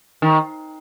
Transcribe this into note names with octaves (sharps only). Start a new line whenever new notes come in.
D#3